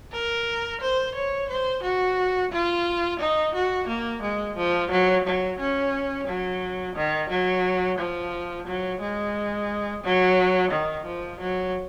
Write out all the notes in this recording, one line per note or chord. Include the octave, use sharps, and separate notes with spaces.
A#4
C5
C#5
C5
F#4
F4
D#4
F#4
A#3
G#3
F3
F#3
F#3
C#4
F#3
D#3
F#3
F3
F#3
G#3
F#3
D#3
F3
F#3